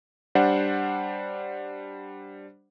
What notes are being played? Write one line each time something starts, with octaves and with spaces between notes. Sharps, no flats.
G3 D4 C5 F#5